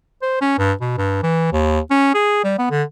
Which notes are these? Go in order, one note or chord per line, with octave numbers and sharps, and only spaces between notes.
C5
C#4
G2
B2
G2
E3
D#2
C#4
G#4
G3
B3
D3